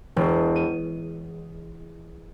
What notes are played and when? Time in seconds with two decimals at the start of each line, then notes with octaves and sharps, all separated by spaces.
0.16 E1
0.56 D#7